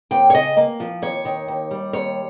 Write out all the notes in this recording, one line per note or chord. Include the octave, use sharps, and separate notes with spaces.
D#2 G5
C#5
C#3 D#5
A#3
F3
D#2 C#5
D#3
D#2
G3
D#2 C#5